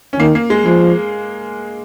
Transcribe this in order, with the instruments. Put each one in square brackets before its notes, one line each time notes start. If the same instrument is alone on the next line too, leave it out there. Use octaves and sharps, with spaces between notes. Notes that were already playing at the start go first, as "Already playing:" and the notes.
[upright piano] C#4
[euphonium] D#3 [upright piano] A#3
[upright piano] A#3
G#3
[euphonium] F3 [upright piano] G#3